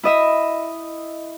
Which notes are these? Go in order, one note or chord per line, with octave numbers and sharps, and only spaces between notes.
E4 D#5 E5